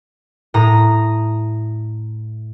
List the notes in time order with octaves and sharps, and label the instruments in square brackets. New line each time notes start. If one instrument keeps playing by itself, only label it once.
[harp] A2 A#5 D#6